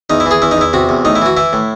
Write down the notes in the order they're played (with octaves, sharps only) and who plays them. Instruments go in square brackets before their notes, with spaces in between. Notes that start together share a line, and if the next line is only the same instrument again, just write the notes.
[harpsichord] E2 D#4
E4
E3 G#4
E2 E4
D#4
E2 E4
C3 F#4
E2
A2 D#4
E4
E3 F#4
E3 E4
A2